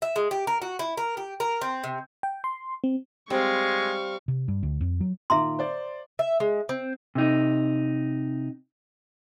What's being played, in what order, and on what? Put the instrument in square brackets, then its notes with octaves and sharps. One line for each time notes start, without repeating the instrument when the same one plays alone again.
[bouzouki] E5
G#3
G4
A#4
F#4
E4
A#4
G4
A#4
C4
C3
[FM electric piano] G5
C6
C4
[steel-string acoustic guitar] G3 [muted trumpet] G#3 [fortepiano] C4 [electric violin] F5 C#6
[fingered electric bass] C3
G2
D2
F2
F#3
[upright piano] A#2 D#3 D6 [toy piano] E5 A#5 C6
[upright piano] C5 D5 A6
[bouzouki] E5
G#3
C4
[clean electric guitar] C3 D#4